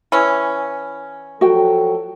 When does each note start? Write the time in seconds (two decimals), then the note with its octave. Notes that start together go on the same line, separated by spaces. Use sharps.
0.12 E3 C#4
1.41 F3 F#3 F#4 A4 G5